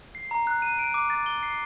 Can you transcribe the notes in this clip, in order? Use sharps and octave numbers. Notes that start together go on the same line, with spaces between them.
C7
A#5
F#6
D#7
D7
D6
A6
G7
C7